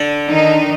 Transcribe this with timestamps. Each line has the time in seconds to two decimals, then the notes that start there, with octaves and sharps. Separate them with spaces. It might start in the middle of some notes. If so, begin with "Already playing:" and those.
Already playing: D3
0.29 D#3 D#4